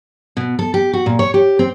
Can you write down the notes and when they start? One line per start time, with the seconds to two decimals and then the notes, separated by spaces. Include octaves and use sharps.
0.37 B2
0.59 A4
0.74 G4
0.93 F#4
1.06 A#2
1.19 C#5
1.34 G4
1.59 C4